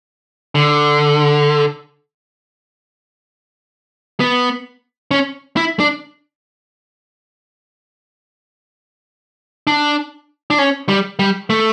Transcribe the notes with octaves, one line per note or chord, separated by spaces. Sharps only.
D3
B3
C#4
E4
D4
D4
D4
C#4
G3
G3
A3